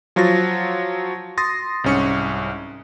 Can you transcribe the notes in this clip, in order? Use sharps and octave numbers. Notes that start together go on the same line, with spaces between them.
F3 F#3 F4 F#4 A6 A#6
C6 D#6 A6 A#6
C2 G#2 C#4 C#6 C#7